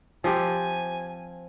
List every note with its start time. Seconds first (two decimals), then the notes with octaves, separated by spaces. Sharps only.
0.24 F3 C4 G4 G#5